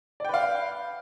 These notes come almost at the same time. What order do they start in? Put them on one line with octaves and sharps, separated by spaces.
D5 G5 B4 F5